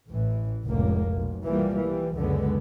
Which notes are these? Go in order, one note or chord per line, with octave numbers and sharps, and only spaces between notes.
A1 E3
F1 C#2 A2 A#3
B1
E3 F3 G3 A#3
E3 G3
C#2 F#2 D3 G#3 B3